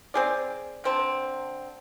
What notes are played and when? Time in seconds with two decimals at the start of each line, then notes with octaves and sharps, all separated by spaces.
0.14 C4 G#4 D5
0.84 D3 C4 A5